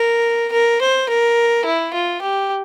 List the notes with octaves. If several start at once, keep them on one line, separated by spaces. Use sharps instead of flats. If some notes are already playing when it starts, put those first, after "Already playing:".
Already playing: A#4
A#4
C5
A#4
E4
F4
G4